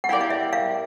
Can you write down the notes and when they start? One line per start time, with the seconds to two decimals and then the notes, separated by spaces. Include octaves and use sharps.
0.04 F#5
0.09 E4 G4 A#4 D5 F5
0.21 F5
0.30 E5
0.53 F5